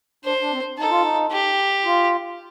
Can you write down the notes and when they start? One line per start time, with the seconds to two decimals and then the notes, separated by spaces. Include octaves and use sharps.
0.25 D4 C5
0.40 D4
0.52 C4
0.78 D#4 A4
0.90 F4
1.02 D#4
1.31 G4
1.85 F4